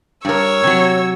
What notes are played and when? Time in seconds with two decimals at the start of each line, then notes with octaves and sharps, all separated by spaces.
0.25 G2 A#4 C#5 E6
0.63 C3 F#3